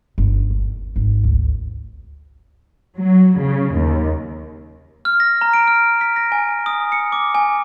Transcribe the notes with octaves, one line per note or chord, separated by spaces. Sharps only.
G1
D#2
G#1
D2
F#3
C#3
D#2
F6
A#6
A#5
D7
F6
B6
A#6
G#5
D#6
C#7
D6
G#5